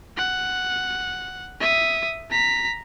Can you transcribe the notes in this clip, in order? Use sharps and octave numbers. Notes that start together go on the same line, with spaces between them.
F#5
E5 D#6
A#5 B6